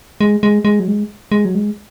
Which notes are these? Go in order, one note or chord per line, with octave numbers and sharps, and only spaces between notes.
G#3
G#3
G#3
F#3
G#3
G#3
F#3
G#3